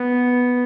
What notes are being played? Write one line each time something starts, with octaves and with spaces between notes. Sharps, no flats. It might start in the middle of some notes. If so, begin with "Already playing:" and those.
Already playing: B3